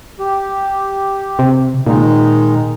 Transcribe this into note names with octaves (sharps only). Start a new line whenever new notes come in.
G4
C3
A#2 D#3 G#3 D#4